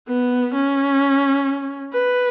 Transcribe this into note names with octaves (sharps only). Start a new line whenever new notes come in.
B3
C#4
B4